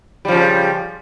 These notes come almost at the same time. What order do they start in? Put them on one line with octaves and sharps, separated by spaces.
G3 F3 C#3